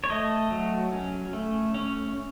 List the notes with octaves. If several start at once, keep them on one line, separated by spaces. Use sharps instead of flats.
C#5
A3 D#5
F#3
C#4
A3
C#4